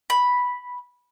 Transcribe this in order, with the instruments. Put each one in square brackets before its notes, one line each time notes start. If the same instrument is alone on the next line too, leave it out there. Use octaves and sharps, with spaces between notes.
[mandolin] B5